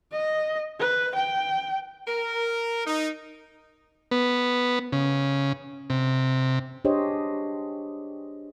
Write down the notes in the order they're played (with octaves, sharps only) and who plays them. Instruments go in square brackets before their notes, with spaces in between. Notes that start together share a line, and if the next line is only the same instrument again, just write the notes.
[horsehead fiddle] D#5
B4
G5
[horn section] A#4
D#4
[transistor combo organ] B3
C#3
C3
[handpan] D4 G4 G#4 C5 C#5 D#5